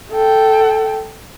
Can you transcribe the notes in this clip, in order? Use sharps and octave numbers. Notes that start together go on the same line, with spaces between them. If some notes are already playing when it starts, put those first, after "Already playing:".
A4 G5